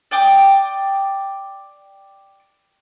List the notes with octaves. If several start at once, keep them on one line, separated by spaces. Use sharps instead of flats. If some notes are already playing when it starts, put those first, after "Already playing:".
D5 G5 D6 D#6